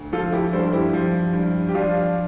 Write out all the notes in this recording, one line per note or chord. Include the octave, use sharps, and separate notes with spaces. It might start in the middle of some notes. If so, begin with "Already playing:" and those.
Already playing: D2
F3 F4 A4
E4 G4
G2 A4 C5
E4 G4
F3
G2
G4
F3 D4 F4